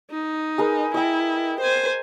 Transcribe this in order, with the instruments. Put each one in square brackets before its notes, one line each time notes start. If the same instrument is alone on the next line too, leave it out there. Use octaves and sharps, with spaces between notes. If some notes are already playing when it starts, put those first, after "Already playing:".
[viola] D#4
[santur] G#4 A#4 B4
[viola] E4 [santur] D#5 G5
[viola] C5 G#5